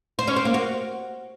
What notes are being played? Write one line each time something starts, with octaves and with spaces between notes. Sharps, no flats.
C5
C#4
C4
A#3
F#4